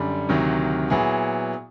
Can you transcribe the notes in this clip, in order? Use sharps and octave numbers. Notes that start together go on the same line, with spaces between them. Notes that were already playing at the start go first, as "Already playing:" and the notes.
Already playing: F#2 D3 G3
D2 C3 D#3 F#3
A#2 F#3 B3 E4 G#4